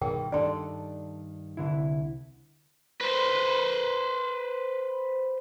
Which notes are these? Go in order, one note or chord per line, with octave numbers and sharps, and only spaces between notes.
G2 B2 D#3 G#4 A#4 G5
G2 D#3 D4 A4 D5 C6
C2 D3 E4
B4 C5